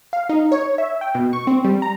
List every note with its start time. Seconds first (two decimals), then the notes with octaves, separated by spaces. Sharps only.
0.13 F5
0.29 D#4
0.52 C#5
0.78 E5
1.01 G5
1.15 B2
1.33 C#6
1.47 C4
1.64 G3
1.82 A#5